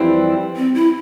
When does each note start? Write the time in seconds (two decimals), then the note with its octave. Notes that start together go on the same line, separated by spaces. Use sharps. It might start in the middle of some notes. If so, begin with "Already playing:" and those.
Already playing: F2 E3 G3 C4 E4
0.56 C4
0.75 E4